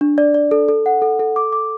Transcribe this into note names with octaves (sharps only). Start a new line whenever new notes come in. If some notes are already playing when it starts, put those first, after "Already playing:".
D4
D5
D5
A4
A4
F#5
A4
A4
D6
D6